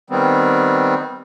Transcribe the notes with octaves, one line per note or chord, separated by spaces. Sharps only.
D#3 G3 B3 C4